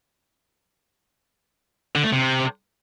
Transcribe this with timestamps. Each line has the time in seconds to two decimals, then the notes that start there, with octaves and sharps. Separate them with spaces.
1.96 D3
2.04 A3
2.12 C3